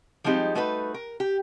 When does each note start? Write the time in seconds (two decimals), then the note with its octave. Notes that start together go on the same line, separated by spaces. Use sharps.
0.24 F3 G3 G#3 C4 D#4 G4
0.55 G3 A3 D#4 F#4 A#4 B4
0.94 A#4
1.20 G4